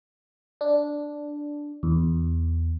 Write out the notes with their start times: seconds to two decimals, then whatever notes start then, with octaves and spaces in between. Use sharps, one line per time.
0.61 D4
1.83 E2